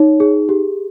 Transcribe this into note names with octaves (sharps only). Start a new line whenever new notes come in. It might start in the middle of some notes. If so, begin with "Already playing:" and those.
Already playing: D#4 C#5
G#4
G4